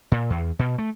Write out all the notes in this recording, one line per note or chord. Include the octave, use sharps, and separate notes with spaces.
A#2
E2
B2
A3